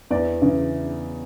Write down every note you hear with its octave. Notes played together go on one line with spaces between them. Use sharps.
E2 D5
C#3 E3